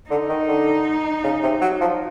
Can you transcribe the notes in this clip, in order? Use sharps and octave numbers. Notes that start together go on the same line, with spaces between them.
D3 D#4
D#3
D3
C#3
C3
F#3
F3